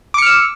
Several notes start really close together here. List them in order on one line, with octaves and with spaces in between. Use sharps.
D6 C#7 F6 E6